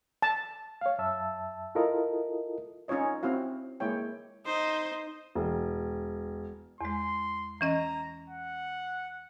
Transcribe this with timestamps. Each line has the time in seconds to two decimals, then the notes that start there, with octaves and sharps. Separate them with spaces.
0.22 A5
0.81 C#5 F5
0.99 F#2 E5 A5 E6
1.75 E4 F4 A4 A#4 D#5
2.88 C#4 D#4 F4 C#5 D#5
3.23 C4 E4 F#4 F5
3.80 G#3 A#3 E4 C#5 G5
4.46 D#4 C5
5.35 E1
6.81 E2 G#3 C6
7.61 E3 C#4 D#5 A#5
8.30 F#5